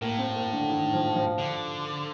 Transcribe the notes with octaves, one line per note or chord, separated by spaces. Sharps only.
A2 A#3
C4
A#3
D3
D#3
F3
F3
D3